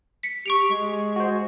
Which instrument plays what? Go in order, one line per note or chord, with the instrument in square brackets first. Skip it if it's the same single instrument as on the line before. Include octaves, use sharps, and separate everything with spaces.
[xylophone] B6 C#7
[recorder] G4 [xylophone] C#6 D7 F7
[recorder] G#3
[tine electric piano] F#4 C5